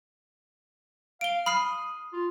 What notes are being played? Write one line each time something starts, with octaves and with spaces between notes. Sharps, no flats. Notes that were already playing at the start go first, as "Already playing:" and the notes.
F5 D7 G7
B5 D#6 F6 C7
F4